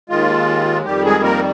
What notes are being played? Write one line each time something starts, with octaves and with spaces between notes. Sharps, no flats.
D#2 D#3 G#3 F4
F2 D#3 G3 G4
G#3 G#4
A#3 A#4